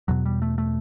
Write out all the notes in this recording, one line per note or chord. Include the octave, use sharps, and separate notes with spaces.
E2 B2 F#3
G3
A3
A3